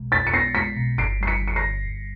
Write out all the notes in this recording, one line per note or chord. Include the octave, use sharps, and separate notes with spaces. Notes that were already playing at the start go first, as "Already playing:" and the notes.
Already playing: B1 B2 G#3
B1 A6 B6
C#7
B3 A#6 C7
G#3 B6 C#7
B2
G1 C7 D7
G3 C7
B6 C#7
D3
C#7
A#6 C7
G2
G1